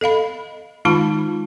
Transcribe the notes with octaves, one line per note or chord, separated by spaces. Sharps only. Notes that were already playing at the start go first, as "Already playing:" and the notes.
A4 D#5 F5 B5
D#3 G#3 D#4 F4 A5 B5